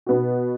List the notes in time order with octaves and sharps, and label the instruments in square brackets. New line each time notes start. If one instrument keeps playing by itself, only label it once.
[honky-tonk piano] B2 B3 F#4